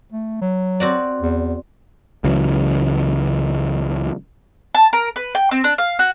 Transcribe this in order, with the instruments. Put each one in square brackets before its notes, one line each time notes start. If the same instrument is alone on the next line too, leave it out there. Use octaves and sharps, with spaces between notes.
[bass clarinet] A3
F#3
[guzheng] C4 F#4 D5
[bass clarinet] E2
[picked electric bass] C#2 C#3 E3 F#3
[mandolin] A5
A#4
B4
G5
C4
D4
F5
F#4